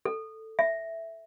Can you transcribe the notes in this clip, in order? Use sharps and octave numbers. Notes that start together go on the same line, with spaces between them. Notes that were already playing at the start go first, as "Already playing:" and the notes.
A4
E5